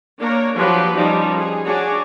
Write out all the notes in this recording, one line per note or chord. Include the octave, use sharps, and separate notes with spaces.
A#3 D4 A#4 C#5
F3 F#3 D4 G4 B4
F3 G3 C#4 D#4
G#4
D4 F#4 G#4 C#5